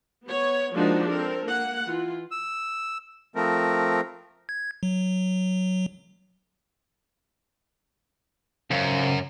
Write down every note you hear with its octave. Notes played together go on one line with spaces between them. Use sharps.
B3 C#5
F3 G#3 A#3 D4 D#4 F#4
C4 A4 A#4
A#3 F#5
E3 F4
E6
F3 A3 C4 A#4
G#6
F#3
F#2 C#3 C5 F5